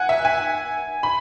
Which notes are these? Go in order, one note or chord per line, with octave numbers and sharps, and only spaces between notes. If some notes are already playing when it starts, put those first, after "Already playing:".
Already playing: F#5 G#5
E5
G#5
B5